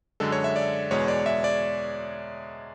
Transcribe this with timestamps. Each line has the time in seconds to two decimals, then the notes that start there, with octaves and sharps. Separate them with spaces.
0.20 F#2 D3 G#3 A4
0.32 C#5
0.44 E5
0.56 D5
0.91 E2 B2 G#3 C#5
1.08 D5
1.26 E5
1.44 D5